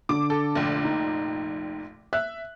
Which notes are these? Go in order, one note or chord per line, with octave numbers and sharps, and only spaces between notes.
D3 D6
A4
F1 A#1
D#4
E5 F#6